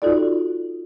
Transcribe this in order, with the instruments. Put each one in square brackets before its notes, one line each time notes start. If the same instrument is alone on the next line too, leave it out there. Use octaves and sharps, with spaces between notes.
[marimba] D#4 F4 F#4 A4 D5